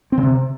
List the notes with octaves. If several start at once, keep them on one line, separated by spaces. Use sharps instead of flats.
C4
C#3
C3